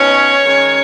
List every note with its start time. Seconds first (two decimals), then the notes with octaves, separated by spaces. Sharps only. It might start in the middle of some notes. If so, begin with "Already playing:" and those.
Already playing: B2 B3 C#4 D#4 C#5
0.43 D#3 G#3 C#4